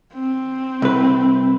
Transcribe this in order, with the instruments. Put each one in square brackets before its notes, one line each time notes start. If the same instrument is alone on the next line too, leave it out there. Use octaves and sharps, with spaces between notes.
[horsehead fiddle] C4
[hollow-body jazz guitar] C2 B4